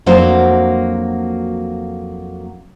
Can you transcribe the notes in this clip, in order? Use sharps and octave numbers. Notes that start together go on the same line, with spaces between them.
F2 F#3 A#3 D4 F#4 C5